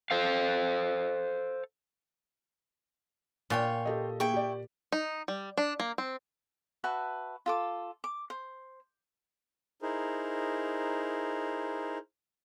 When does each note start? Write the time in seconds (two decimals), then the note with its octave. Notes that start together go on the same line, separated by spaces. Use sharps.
0.11 A4 C5 F5
3.50 A#2 F4 C#5 G5 G#5
3.85 G4 A4 D#5
4.20 A#3 E4 G#4 G5 C#6
4.34 G4 D5
4.92 D#4
5.28 G3
5.58 D4
5.80 A#3
5.98 C4
6.84 F#4 B4 E5 A5
7.46 F4 A4 D6
8.04 D6
8.30 C5
9.82 D#4 E4 G#4 A#4 C5